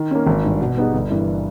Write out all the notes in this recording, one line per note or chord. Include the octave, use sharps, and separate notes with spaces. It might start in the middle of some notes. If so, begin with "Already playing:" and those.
Already playing: D#3
A#3 C#4
G#1
G2 D#3
B2
G3 B3 D#4 G#4
G1
G2 E3 A#3